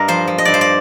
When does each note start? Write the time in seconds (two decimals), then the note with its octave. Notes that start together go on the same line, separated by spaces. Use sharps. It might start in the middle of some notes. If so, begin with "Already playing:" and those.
Already playing: G2 A#4 D#5
0.08 F3 C5
0.27 F3
0.38 D#5
0.45 G2 D5
0.54 C5
0.61 D5